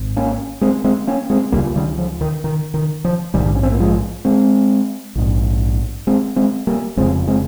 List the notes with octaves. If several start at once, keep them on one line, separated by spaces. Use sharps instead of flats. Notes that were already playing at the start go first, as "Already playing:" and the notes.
Already playing: G#1
A#3 C#4
G#3 C4
G#3 C4
A#3 C#4
G#3 C4
C#2 C#3 G3 A#3
D#3 G3
F3
D#3
D#3
D#3
F3
A#1 G#2 D#3 G3
C#4
C4
A#3
F3 G#3
G#3 C4
A#1 G#2
G#3 C4
G#3 C4
G3 A#3
F1 F2 C#3 G#3 C4
G#3 C4